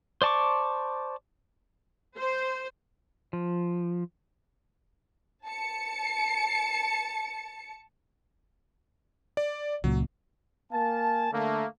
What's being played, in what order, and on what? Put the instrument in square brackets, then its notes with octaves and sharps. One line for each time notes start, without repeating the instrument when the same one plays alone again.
[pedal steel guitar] C5 D5 A5 C#6 D6
[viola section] C5
[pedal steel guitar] F3
[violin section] A5 C#7
[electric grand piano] D5
[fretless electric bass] C#2 A#2 [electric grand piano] F#3
[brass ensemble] A#3 F5 G#5 A5
D3 A3 A#3